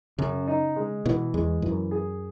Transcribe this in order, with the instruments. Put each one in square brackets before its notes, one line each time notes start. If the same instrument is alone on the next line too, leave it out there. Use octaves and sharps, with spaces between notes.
[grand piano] F#2 [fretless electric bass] C#3
[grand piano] D#4
G#3
[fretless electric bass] B2 [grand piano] E3
[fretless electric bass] E2 [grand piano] G#3
[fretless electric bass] F#2 [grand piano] E3
[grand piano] G#4